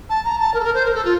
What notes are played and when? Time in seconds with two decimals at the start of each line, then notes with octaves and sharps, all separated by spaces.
0.09 A5
0.24 A#5
0.39 A5
0.53 A#4
0.60 A4
0.63 A#4
0.73 C5
0.84 A#4
0.94 A4
1.04 F4